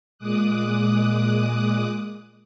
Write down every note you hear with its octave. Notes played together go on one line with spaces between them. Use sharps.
A#2 G#3 D6 D#6 F#6